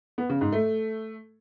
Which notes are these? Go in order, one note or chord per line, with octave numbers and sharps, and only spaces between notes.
B3
C#3
G#2
A3